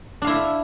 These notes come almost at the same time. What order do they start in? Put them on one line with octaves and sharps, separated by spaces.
D4 F5 E4 E5